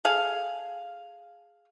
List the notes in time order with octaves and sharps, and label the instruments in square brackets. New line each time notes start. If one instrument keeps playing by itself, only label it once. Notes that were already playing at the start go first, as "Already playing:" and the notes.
[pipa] G#4 A4 F5